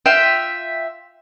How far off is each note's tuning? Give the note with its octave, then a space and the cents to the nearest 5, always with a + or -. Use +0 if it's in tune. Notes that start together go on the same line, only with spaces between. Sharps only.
F4 +0 E5 +0 G5 +0